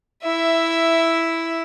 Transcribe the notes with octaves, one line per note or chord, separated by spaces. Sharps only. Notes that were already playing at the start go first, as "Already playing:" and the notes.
E4 E5